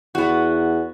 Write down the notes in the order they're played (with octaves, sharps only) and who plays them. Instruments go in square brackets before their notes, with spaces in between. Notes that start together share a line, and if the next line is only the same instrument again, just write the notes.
[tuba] E2 [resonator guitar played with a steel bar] B3 F#4